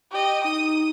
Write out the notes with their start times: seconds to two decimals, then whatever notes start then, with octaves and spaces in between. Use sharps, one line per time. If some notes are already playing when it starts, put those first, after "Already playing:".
0.11 G4 D#5
0.44 D#4 D#6